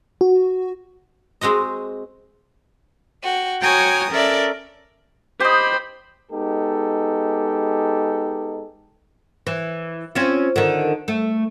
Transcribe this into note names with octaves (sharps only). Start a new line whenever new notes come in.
F#4
G#3 C4 F#4 D#5
F#4 G5
F#4 C#5 G5 G#5 A#5 D#6
C#4 A4 A#4 D5 E5
G4 C5 D#5 B5
G#3 B3 D#4 G4 A4
E3
C4 C#4 F4
D3 D#3
A3